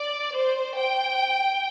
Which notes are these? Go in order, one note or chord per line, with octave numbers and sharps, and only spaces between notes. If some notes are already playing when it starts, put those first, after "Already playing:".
Already playing: D5
C5
G5